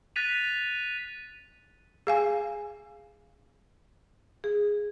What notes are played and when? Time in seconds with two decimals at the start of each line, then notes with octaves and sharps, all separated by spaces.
0.16 F#6 A6 B6 D#7 F7
2.07 G#4 F5 G#5
4.44 G#4